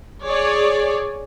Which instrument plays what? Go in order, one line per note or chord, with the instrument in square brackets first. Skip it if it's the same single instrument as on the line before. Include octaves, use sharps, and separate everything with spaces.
[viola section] G#4 C#5 D5